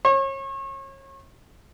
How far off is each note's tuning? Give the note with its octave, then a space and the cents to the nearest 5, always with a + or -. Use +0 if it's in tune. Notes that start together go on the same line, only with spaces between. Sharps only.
C#5 -35